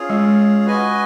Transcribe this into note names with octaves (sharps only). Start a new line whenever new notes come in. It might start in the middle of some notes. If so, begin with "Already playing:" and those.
Already playing: C#4 F4 G#4
G#3
F#4 B4 D#5 G#5